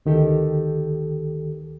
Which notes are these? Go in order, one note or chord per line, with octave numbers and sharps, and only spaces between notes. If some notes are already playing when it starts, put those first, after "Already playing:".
D2 D#3 G4 A4